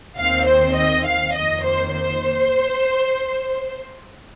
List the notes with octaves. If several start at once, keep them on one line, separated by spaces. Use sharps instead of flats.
D#2 D#3 C4 F5
C5
D#5
F5
F2 D#3 A#3 D#5
C5
C5